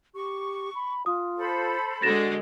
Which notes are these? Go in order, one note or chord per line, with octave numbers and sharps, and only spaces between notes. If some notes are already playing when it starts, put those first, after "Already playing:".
G4 C#6
B5
F4 D#6
A4 C5 B5
D3 G#3 F#4 A6 A#6 E7